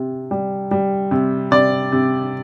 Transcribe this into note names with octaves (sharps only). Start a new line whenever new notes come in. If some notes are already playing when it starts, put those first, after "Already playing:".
Already playing: C3
G3
G3
C3
C3 D5
C3